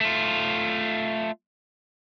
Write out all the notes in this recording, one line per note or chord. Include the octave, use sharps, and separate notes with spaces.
A3 F4